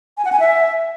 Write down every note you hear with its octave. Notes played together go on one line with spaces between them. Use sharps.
G#5
F#5
G#5
E5